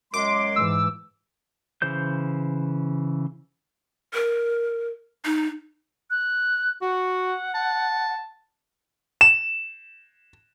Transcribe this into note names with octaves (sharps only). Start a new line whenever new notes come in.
F#2 G#3 C6 D6
G#2 E3 E6
C#3 E3 C5 G6
A#4
D#4
F#6
F#4 F#5
A5
E7